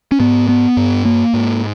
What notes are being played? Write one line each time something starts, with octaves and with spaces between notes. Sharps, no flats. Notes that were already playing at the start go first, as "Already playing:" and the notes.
C#4
G#2 B3
B3
G2
A#3
G#2